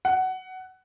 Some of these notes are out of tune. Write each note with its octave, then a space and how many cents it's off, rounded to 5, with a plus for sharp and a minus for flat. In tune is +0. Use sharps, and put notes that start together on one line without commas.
F#5 +15